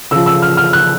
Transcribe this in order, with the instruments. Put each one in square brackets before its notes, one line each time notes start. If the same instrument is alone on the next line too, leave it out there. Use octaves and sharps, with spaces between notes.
[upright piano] C#3 F3 E6
E6
F6
F6
F#6